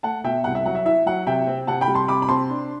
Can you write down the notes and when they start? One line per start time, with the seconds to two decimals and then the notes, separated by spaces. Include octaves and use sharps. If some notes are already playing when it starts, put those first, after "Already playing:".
0.03 A3 F#5 A5
0.24 B2 E5 G5
0.44 C2 F#5
0.55 E5
0.66 F#3 F#5
0.75 E5
0.85 E4 E5
1.06 F#3 F#5
1.27 C3 E5 G5
1.47 C4
1.67 C3 F#5 A5
1.81 G5 B5
1.88 G3
1.94 A5 C6
2.08 C3 B5 D6
2.22 B5
2.29 C4 A5 C6
2.50 D4